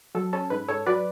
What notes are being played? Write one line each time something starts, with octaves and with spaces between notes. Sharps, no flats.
F#3 A4
C#4 A4
G#2 B4
G#2 A4 C#5
F#3 B4 D5